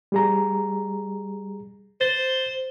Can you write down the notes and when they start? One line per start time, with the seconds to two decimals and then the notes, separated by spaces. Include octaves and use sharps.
0.12 G3 G#4 A#5
2.01 C5 A6